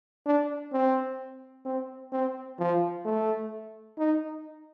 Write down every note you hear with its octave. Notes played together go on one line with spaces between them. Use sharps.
D4
C4
C4
C4
F3
A3
D#4